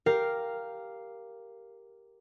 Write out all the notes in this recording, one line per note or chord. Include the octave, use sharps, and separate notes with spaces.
G4 A#4 F5